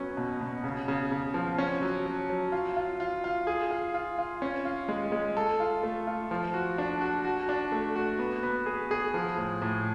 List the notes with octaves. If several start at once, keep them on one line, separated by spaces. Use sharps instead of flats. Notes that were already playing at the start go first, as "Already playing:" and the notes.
Already playing: F#3 B3 C#4
B2
B2
C#3
C#3
C#3
F3
C#4
F#3
F#3
F#3
F4
F4
F4
F4
G#4
F4
F4
F4
C#4
F4
G#3
G#3
A4
F4
A3
F4
F3
F#4
D4
F#4
F#4
D4
A3
F#4
B3
B3
G#4
G#4
F3
A2
A2